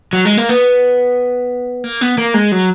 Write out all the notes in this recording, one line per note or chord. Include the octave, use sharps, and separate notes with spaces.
F#3
G#3
A#3
B3
A#3
B3
A#3
G#3
F#3